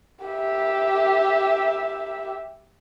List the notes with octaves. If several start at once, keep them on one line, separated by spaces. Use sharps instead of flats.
G4 E5